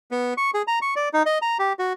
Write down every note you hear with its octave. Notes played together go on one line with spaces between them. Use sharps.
B3
C#6
G#4
A#5
C#6
D5
D#4
D#5
A#5
G4
F#4